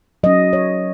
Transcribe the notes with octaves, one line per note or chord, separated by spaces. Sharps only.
F#3 C#4 D#5
C#5